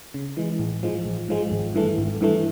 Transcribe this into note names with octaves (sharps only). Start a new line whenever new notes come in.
C#3
E3 G#3
A1
G#2 F3 G#3
A1
G#2 F3 G#3
G#1
G2 E3 A3
G#1
G2 E3 A3